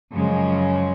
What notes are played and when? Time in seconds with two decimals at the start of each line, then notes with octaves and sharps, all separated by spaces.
0.11 F#2 C#3 F3 G#3 C#4